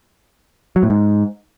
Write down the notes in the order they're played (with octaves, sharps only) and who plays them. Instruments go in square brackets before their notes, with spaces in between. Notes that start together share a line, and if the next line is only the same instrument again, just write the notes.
[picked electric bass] F#3
A2
G#2